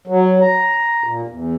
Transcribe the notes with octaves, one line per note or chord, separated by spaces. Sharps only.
F#3
A#5
A#2
E2